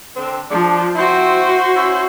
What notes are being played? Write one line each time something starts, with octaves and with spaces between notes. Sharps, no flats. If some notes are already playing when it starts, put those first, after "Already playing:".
D3 C4
F3 D4
C4 E4 F#4 C5
C#4 E4